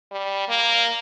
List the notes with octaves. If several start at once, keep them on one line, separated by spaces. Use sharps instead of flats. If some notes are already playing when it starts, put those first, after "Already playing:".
G3
A#3